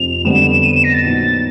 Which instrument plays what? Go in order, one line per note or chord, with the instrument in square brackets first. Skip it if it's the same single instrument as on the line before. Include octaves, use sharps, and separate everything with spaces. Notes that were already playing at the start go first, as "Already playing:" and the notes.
Already playing: [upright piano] F1 F2 C3 F3 [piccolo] F7
[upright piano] F2 D3 G3 B3 [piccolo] E7
[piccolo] D#7
E7
A#6
A6
[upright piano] A#2 F#3 B3 D#4